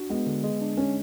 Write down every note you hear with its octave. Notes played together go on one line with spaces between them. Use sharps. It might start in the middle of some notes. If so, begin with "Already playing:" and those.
Already playing: D4 F#4
G#3 B3
D3
G#3
D4
C#4